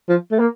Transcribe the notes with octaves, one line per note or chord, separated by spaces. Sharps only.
F3
A3
A#3